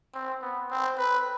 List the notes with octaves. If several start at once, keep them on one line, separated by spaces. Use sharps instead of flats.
C4
B3
C4
B4